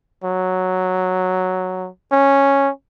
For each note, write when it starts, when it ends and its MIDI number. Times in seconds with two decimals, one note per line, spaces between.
0.24 1.89 54
2.12 2.70 61